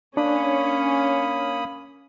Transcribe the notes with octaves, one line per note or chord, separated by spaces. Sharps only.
A#3 C#4 D4 B5 D#6